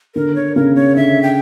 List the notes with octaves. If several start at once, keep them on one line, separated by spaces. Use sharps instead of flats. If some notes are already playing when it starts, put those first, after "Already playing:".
D3 A#4
C#5
C#3 A#4
C#5
D3 E5
G5